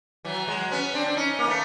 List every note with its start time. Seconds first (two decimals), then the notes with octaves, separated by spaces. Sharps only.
0.25 E3 F#3
0.48 F#3 G#3
0.71 B3 C#4
0.94 C4 D4
1.06 D4
1.17 C#4 D#4
1.39 A#3
1.48 A3 B3